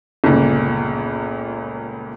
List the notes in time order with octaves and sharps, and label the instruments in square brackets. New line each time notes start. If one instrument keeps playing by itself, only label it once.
[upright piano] G1 C#2 A#2